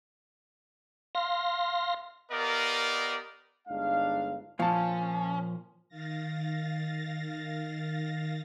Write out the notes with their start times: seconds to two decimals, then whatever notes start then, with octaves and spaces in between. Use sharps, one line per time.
1.15 F5 C6 A#6
2.31 B3 G4 A#4 D5 D#5 F5
3.68 G1 G#3 D4 D#4 F5
4.60 A#2 F3 C#4 F5 A5
5.88 D#3 F5 A6 A#6